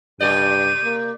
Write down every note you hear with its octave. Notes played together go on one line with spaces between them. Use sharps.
G2 C3 G4 D5 G6 D#7
A#3